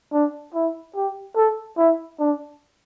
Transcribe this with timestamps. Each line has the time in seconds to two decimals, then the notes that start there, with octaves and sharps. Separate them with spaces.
0.13 D4
0.54 E4
0.95 G4
1.36 A4
1.78 E4
2.20 D4